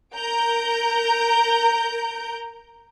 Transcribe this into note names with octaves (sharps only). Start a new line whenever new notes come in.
A#4 A#5 G6 D7